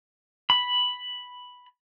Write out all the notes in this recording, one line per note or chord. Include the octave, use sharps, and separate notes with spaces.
B5